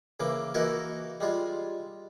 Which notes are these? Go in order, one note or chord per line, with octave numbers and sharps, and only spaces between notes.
C#3 E3 A#3 D6
E3 A#3 D#4 E4 F#4 A#4
G3 G#3 F4